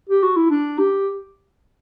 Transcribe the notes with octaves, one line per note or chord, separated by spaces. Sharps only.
G4
F#4
E4
D4
G4